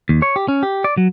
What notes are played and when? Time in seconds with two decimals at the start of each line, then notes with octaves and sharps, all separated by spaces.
0.09 D#2
0.22 C#5
0.36 G4
0.48 C#4
0.63 G4
0.84 D5
0.97 F#3